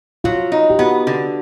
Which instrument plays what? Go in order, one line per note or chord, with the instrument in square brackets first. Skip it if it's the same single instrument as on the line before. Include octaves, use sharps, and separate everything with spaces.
[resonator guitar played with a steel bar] F#3 [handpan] F4
[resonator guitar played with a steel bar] D#4
[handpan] G4
[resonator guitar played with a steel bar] B3 [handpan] F#4
[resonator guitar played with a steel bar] D3